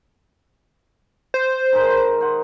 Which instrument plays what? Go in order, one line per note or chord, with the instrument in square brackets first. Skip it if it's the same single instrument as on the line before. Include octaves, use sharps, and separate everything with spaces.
[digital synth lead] C5
[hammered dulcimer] D#3 G#3 A#4
C5 F#5